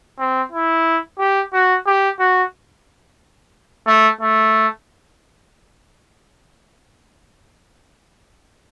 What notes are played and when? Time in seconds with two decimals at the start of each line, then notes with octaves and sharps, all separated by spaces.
0.19 C4
0.52 E4
1.19 G4
1.53 F#4
1.86 G4
2.20 F#4
3.87 A3
4.21 A3